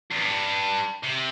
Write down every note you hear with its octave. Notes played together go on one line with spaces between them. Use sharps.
E2
G2
C3